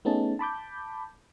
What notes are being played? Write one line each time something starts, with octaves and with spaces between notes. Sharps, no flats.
A3 B3 C#4 D#4 G#4 A5
A5 B5 D6 G6